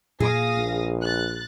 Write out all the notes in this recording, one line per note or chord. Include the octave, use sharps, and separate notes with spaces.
A#2 G#4 F5 D#6 A#6
A#1
F#6 A6